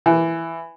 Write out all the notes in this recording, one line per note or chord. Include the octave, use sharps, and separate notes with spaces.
E3